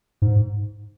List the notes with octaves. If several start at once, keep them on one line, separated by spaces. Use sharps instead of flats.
G#2